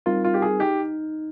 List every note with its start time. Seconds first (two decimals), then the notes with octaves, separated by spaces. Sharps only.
0.06 G3 C4 D#4 F4 A#4
0.24 F4
0.34 G4
0.42 G#4
0.60 D#4 G4